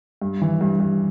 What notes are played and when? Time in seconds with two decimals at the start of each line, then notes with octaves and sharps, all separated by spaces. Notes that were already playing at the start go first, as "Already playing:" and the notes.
0.22 G2
0.42 E3
0.61 G2
0.80 G2